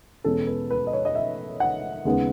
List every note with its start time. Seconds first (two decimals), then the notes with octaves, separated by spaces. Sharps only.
0.24 E2 B2 G#3 C#4 A4
0.47 B4
0.70 B4
0.87 D#5
0.93 C#5
1.05 D#5
1.15 E5
1.60 F#5
2.05 D#2 C#3 G#3 B3